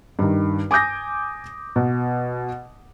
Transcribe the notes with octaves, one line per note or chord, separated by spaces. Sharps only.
G2 D#3
G#5 D6 D#6 G6 A#6
B2